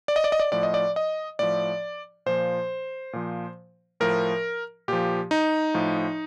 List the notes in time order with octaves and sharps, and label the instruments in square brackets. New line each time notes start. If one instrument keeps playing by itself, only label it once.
[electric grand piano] D5
D#5
D5
D#5
D5
A2 F3 D5
D#5
D5
D#5
A2 F3 D5
A#2 F3 C5
A#2 F3
A2 F3 A#4
A#2 F3 G4
D#4
A2 F3